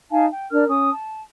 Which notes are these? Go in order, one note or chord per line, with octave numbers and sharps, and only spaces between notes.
D#4 F5 G#5 A5
G5
D4 A#4 F6
C#4 D#6
A5